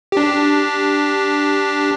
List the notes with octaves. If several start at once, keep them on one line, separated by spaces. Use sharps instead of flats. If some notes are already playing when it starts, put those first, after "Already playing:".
D4 G4